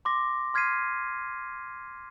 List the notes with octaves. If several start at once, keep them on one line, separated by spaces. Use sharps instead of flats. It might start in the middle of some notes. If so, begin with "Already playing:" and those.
C6 D6 A#6
C6 F6 G#6 B6 C7 D#7